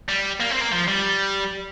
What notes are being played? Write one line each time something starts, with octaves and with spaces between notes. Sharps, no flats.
G3
A#3
C4
A#3
F3
G3